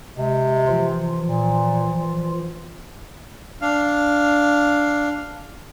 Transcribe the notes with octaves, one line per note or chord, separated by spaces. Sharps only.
C3 G#3
E3 F3 F4
A#2
D4 F5